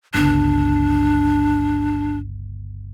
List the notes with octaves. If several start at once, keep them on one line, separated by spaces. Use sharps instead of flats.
G1 C#2 D4